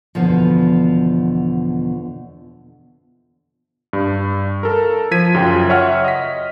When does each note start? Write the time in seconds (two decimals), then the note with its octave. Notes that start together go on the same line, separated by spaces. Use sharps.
0.15 E2 B2 D3 F3
3.93 G2
4.63 A4 A#4
5.11 F3 G#6 B6 D#7
5.34 F#2 C#3 F4 G5
5.69 C#5 E5 F#5 F6
6.04 D#5 B6